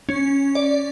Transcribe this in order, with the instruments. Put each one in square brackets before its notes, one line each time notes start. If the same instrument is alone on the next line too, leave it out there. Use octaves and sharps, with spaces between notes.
[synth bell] C#4
D5